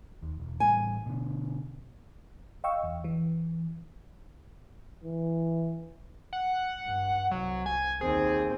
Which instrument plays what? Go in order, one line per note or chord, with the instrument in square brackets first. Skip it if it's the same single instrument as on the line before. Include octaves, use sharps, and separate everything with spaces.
[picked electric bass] D#2
E1
[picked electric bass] A1 A2 G3 [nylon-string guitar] G#5
[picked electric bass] B2 D3
[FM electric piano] D#5 F5 G5 C#6 E6
E2
E3
[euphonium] E3
[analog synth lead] F#5
[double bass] G2
[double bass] C2 [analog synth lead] F#3
[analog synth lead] G#5
[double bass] D#2 C4 [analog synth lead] G#4